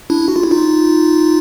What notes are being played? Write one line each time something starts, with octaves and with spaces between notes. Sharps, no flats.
D4 E4
F#4
F4
E4
D#4 F4